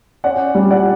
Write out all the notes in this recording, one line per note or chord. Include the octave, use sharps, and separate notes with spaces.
C#4 D5 F#5
G3
D5 F#5